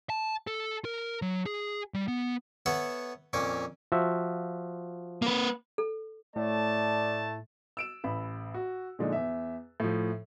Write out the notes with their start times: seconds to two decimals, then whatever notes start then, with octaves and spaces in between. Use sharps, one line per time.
0.10 A5
0.47 A4
0.85 A#4
1.22 F#3
1.46 G#4
1.94 G3
2.08 B3
2.66 B3 A4 C#5 E5 F#5
3.33 F2 A#2 C#4 C#5 D6
3.92 F3 F#4 E5
5.22 A#3 B4
5.78 A4
6.36 A2 A3 D5 A5
7.77 E6 D7 E7
8.04 A1 B5
8.54 F#4
8.99 A#2 D3 F3 G#3 D4 D#4
9.12 E2 E5
9.80 A2 F3